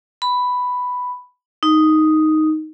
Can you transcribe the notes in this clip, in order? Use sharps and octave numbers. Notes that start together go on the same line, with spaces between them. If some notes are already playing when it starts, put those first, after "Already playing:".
B5
D#4